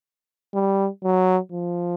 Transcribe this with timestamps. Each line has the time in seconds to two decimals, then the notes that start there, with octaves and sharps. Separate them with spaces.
0.54 G3
1.04 F#3
1.52 F3